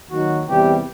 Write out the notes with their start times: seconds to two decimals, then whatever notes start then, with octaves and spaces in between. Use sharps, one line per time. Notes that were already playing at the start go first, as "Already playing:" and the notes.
0.10 D#2 D#3 F#3 F#4
0.47 E2 C3 E3 G3 G4